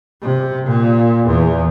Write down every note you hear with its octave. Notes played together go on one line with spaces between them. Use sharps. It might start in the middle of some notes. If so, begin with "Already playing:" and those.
C3
A#2
E2